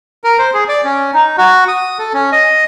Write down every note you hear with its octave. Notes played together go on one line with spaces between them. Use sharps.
A#4
C5
G#4
D5
C#4
D#4
F#4
D#6
A4
C#4
D#5